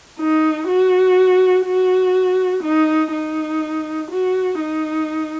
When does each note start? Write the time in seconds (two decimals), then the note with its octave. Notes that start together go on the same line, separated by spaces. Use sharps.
0.20 D#4
0.68 F#4
1.66 F#4
2.63 D#4
3.12 D#4
4.11 F#4
4.59 D#4